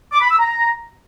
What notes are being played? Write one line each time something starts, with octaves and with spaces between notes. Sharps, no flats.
D6
B5
E6
A#5